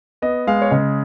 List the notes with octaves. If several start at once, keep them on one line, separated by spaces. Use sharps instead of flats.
B3 D#5
G#3 F5
C#5
C#3 D#5